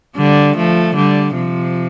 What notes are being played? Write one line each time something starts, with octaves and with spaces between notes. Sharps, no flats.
D3 G3
F3 A3
D3 G3
C3 F3